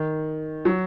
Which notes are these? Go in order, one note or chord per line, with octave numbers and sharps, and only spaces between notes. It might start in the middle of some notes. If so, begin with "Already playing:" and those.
Already playing: D#3
F#3